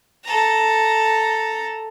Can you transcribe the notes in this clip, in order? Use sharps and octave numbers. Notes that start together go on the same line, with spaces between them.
A4 A#5